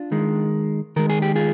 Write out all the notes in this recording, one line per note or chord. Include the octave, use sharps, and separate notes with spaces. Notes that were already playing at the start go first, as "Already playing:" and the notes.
Already playing: D4 F4
D#3 G#3
D#3 G#3 A#4
G#4
G4
F4 G#4